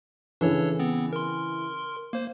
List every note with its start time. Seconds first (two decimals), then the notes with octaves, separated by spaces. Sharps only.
0.41 C#3 E3 D4 A4 C#5
0.79 B3 C4
1.13 A#4 C6
2.13 A#3 C5